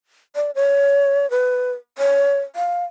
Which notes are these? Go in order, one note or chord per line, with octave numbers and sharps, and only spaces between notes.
D5
C#5
B4
C#5
F5